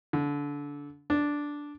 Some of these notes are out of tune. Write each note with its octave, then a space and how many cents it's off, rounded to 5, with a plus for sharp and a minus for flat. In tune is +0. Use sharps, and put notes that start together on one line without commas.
D3 -25
D4 -5